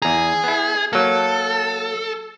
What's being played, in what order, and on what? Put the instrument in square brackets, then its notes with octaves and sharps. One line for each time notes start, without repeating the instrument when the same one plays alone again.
[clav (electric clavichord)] E2 A#5 [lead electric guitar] G#4
[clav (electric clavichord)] B3 E4
[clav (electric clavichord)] F#3 A#3 [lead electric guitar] A4